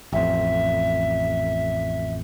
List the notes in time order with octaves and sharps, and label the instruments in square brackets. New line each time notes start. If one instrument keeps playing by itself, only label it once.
[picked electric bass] A1 F2 [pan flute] E5